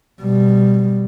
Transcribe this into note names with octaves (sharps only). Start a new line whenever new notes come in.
B2 G3